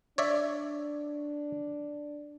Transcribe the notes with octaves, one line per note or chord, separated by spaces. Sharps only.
D4 C#5 D5 E5